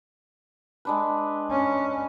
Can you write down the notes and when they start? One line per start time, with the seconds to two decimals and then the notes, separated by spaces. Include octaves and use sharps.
0.85 G#3 D4 B4
1.51 C#4